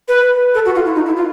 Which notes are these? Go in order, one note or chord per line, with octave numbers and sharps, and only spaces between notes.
B4
A4
F#4
F4
E4
D#4
E4
F4